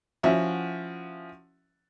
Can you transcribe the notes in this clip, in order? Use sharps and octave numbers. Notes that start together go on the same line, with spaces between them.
F3 C#4 E4 F#4 E5 F#5